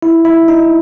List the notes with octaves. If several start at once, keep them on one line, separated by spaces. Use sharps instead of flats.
E4
E4
D#4